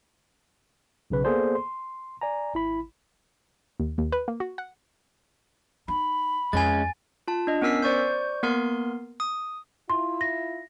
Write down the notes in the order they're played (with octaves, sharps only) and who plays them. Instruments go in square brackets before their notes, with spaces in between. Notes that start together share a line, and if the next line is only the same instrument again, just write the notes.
[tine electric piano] B1 C#3 B4
A#3 B3 G#4 A4 C5 D5
C6
D5 G#5 A#5
G#1 E4 B5
[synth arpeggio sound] D#2
D#2
B4
A#3
F#4
F#5
[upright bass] D#4 [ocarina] B5
[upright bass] F2 [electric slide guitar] G#3 C#4 [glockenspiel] G#5 A6
[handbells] F4 A5
D4 D#5
B3 C#4 A#4 E6 B6 C7
C5 D5 C#6 G6
A#3 B3 A#4 C6 C7
D#6
[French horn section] E4 F4 [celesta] C6
[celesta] A#6